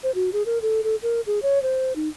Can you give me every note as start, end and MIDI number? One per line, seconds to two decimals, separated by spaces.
0.03 0.11 72
0.15 0.30 66
0.33 0.43 68
0.46 0.58 70
0.62 0.81 69
0.84 0.96 69
1.03 1.21 70
1.27 1.39 68
1.43 1.61 73
1.63 1.93 72
1.96 2.08 63